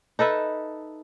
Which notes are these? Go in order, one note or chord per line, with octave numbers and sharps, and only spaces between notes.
D#4 A4 B4 E5